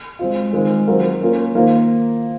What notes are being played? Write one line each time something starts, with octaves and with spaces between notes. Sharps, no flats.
G#3 C4 F4
D#3 G#3 C4 F4 A#4
D#3 F#3 C4 F4 A#4
A#3 C#4 F4 A#4
D#3 A#3 F4 C5